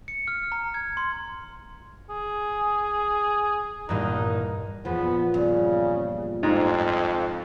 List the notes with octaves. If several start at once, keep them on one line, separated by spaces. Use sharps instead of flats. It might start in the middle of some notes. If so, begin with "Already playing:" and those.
C#7
F6
A#5
G#6
C6
G#4
E2 G2 A#2 D#4
E2 A#2 F3 B3
G2 C#3
F2 G#2